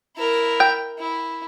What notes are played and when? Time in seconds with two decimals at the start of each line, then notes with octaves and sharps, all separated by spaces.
0.16 E4 A#4
0.60 G5
0.98 E4